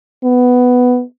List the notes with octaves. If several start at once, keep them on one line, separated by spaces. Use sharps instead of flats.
B3